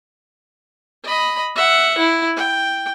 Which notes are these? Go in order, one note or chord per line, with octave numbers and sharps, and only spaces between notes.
D#5 B5
E5 F#5
E4
G5